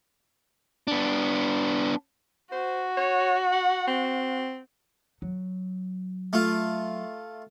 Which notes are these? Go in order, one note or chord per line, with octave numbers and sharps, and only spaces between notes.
B3 D4
F#4 C5
C#5
F#5
C4
F#3
A3 F4